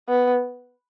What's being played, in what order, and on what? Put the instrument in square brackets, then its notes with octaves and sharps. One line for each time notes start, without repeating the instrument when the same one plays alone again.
[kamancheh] B3